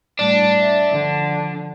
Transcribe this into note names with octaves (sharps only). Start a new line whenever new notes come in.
A2 G3 D4
E5
D3 F3